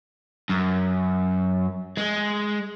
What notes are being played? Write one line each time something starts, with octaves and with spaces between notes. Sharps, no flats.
F#2
G#3